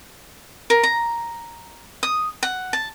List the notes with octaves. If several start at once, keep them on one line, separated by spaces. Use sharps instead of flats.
A#4
A#5
D#6
F#5
A5